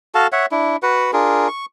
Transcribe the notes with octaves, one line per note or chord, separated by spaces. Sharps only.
F#4 A4 F5 A5
C#5 E5 F#5
D4 E4
F#4 B4 F#5
D4 F4 G#4 A#4
C#6